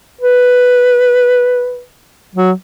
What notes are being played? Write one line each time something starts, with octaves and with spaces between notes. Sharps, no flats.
B4
F#3